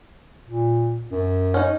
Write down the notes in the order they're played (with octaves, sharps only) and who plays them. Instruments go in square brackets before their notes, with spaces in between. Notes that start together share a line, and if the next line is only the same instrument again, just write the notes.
[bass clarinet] A#2
F#2
[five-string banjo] C#4 D#4